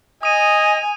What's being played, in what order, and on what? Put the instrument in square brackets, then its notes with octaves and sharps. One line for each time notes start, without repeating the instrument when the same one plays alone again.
[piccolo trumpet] D#5 [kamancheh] G#5 [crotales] D#6 D#7